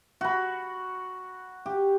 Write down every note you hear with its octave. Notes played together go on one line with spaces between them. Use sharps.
F#4 B5
G4